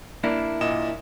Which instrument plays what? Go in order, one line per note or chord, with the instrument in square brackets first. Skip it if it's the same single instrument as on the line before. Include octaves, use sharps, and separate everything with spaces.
[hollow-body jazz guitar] A#3 D4 E4
[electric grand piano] A#2 D#5 E7